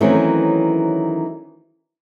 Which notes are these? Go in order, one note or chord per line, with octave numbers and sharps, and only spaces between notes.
D#3 E3 F#3 A3 C4 C#4